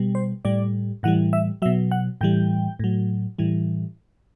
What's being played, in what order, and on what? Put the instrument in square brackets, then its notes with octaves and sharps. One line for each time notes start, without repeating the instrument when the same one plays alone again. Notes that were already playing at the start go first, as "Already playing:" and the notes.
Already playing: [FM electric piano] B2 G3
C5
A2 G3 D5
A2 E3 G3 F#5
E5
B2 F#3 E5
F#5
A2 E3 G3 G5
A2 F#3
A2 E3 G3